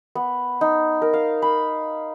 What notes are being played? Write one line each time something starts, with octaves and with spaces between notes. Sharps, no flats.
B3
D#4
A#4
F5
B5